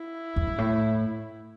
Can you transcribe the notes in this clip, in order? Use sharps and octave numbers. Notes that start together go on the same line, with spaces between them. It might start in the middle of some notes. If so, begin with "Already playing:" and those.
Already playing: E4
E2
G2
A2